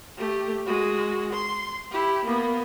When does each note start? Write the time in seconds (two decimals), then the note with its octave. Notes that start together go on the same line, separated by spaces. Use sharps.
0.17 A3 G4
0.66 G#3 F#4
1.33 C6
1.91 E4 G4
2.25 A#3 B3